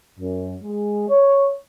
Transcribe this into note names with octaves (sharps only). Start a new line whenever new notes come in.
F#2
G#3
C#5